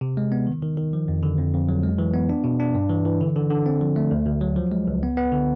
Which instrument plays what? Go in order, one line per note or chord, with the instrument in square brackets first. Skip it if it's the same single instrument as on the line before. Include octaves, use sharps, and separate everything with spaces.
[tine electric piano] C3
G#3
B3
D#3
D#3
D#3
F3
F2
D3
F2
F2
F#3
G#3
E3
B3
D4
B2
D4
G2
E3
E3
D3
D3
D3
C4
F3
A3
D2
D2
F#3
F3
G#3
C#2
B3
B3
D3